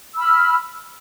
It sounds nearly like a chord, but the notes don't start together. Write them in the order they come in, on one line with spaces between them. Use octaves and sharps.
E6 B5 F6